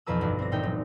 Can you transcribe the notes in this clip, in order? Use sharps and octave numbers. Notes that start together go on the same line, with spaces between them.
B1 F2 E3 B4 A#5 E6
G1 F#4
C4 A#6
E1 A#2 D#4 E5 G5
F#3